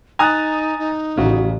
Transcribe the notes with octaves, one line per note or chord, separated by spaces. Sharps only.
D#4 G#5 A#5 D#6 F#6 A6
D#4
A1 C#3 A3 F#4